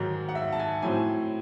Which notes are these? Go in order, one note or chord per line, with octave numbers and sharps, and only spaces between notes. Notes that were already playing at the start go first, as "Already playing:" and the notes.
Already playing: G#2 D#3 F#3
F#5
E5
A5
G#5
A2 F#3 C4 G#5